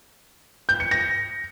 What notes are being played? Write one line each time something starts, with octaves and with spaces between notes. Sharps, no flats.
G6
C#7
A#6